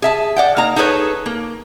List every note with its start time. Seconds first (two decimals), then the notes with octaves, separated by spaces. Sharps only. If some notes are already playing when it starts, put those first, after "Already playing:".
0.02 G#4 E5 A5
0.36 D5 F#5 G5
0.57 A#3 D#4 A#5
0.76 D#4 G#4 A4 B4 C#5
1.26 A#3